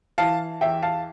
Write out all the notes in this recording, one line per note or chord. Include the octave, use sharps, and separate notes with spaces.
E3 F5 A5
E2 E5 G5
F5 A5